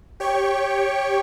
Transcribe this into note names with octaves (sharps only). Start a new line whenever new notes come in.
G4 C#5 G5 C#6